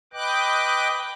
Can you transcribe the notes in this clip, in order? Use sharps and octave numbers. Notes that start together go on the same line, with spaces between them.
B4 D#5 G5 D6 F#6